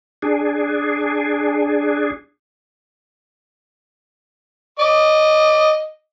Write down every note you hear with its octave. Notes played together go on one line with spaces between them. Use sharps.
D4 G#4
D#5 D6